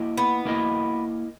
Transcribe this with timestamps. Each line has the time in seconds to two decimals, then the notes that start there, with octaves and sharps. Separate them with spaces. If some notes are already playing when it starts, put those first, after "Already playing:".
Already playing: A#3 E4 A#4 D#5
0.18 B3
0.45 A#3 E4 A#4 D#5